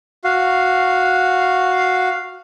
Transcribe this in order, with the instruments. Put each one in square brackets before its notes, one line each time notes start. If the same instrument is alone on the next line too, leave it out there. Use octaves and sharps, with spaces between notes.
[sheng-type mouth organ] F#4 F5